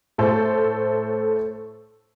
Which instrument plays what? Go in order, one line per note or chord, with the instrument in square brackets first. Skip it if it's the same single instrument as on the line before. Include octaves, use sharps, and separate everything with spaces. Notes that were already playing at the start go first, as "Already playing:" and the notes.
[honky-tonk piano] A2 A3 A4 C5